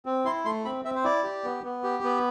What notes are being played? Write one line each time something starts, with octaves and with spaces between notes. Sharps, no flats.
C4
E4 C6
A3 C6
C4 B5
C4 E5
C5
E4 D5
G4
B3
B3
G4
B3